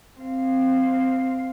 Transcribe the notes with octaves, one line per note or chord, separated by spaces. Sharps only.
C4 F5